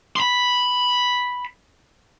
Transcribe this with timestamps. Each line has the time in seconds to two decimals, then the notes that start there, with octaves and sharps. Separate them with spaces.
0.16 B5 C6